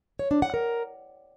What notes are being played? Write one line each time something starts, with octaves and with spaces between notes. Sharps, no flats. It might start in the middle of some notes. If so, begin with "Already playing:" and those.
C#5
D4
F#5
A#4